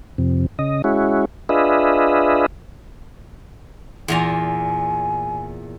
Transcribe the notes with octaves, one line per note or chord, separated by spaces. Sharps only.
F2 C3
C#3 D#5
G#3 C#4 E4 F#4
D4 F4 G#4 B4 D#5 E5
E2 A#2 G#5 A#5